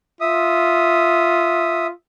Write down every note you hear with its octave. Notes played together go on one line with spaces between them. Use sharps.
F4 E5 D#6